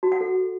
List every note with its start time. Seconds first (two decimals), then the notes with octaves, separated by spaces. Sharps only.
0.03 F#4
0.12 F#5
0.21 A4